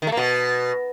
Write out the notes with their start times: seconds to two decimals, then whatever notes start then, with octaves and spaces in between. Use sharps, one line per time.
0.02 D#3
0.07 A3
0.12 A#3
0.17 B2